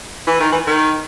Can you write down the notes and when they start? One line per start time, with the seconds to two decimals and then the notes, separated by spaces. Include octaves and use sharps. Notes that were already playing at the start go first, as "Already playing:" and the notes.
0.27 E3
0.40 D#3
0.52 E3
0.67 D#3